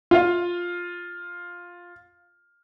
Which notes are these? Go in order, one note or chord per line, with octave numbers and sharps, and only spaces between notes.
F4 F5